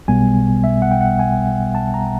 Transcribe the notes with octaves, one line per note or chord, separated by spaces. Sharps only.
B1 B2 G3 B3 G#5
E5
F#5
G5
F#5
G#5
A5
A#5